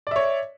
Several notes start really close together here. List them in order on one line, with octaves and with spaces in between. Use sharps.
D5 E5 C#5